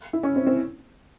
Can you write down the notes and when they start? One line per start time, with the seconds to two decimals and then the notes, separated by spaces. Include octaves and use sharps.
0.13 E4
0.23 C#4
0.36 C4
0.47 C4